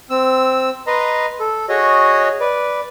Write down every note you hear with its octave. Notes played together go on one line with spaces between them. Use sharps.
C4 E6
B4 D#5 A#5 C6
A4
F#4 G#4 C#5 D#5
B4 D5